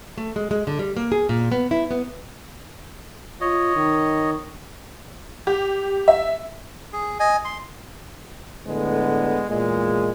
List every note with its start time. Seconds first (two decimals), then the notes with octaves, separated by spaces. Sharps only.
0.18 A3
0.36 G#3
0.51 G#3
0.67 D3
0.79 G3
0.97 A#3
1.12 G#4
1.29 A#2
1.52 B3
1.71 E4
1.91 B3
3.41 F4 C#5 D#5
3.76 D#3
5.47 G4
6.08 E5
6.93 G#4
7.20 D#5 G#5
7.45 C6
8.66 A2 D3 G#3 B3
9.50 E2 A#2 G#3